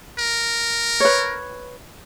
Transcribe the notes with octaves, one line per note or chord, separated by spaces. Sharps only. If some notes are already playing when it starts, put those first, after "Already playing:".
A#4
B4 C#5